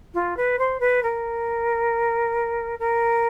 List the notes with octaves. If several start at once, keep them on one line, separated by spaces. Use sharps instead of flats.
F4
B4
C5
B4
A#4
A#4